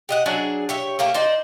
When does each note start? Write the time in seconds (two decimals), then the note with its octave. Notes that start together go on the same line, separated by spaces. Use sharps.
0.09 G4 D#5 F#5
0.26 F#3 D4 G#4 E5
0.69 G4 C#5 E5
0.99 A3 A#3 G4 A#4
1.14 D#4 C5 D5